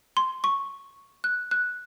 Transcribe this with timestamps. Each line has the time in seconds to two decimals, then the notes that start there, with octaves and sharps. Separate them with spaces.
0.17 C6
0.44 C#6
1.24 F#6
1.51 F#6